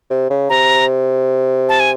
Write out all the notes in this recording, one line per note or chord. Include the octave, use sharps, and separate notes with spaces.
C3
C#3
C3 A#5
A5
G#5